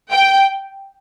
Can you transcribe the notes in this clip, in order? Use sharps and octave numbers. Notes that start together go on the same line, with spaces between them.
G5